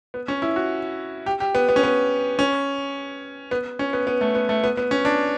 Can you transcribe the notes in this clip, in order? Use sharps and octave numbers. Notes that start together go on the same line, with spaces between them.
B3
C#4
E4
F#4
G4
G4
B3
B3
C#4
B3
C#4
B3
C#4
B3
B3
A3
B3
A3
B3
B3
C#4
D4